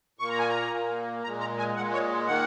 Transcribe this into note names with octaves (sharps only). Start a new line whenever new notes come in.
A#2 A#3 C#6
A#5
G#5
A#5
A#2 A#3
A#2 G#3 A#5
A#5
G#5
A#2 G#3 F#5
C#5
D#3 A#3 F#5